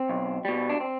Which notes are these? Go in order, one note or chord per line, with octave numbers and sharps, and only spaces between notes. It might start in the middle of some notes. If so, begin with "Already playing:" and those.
Already playing: C4
B1
B2 G3
D4
C4